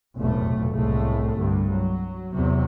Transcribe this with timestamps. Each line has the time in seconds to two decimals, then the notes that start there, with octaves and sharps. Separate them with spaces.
0.17 F1 B1 E2 A2 A3
0.72 C2 A2 G#3 A3
1.37 C2 G2 D3
1.71 F#3
2.34 E2 C3 F#3